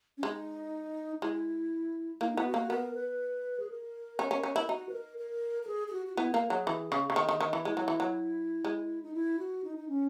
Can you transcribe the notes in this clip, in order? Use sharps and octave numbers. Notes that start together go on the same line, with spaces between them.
C#4
G#3 D#4
G#3 E4
A#3 E4
D#4
B3 E4
F#4
A#3
B3 A#4
B4
G#4
A#4
C#4
C#4
C#4
E4
D#4 F#4
B4
A#4
A#4
A#4
G#4
G#4
F#4
F#4
B3 E4
A#3 A#4
F#3 G#4
E3
C#3
C#3
D#3
D#3
D#3
E3
G#3 E4
F#3
E3
F#3
G#3
D#4
E4
F#4
D#4
D#4
C#4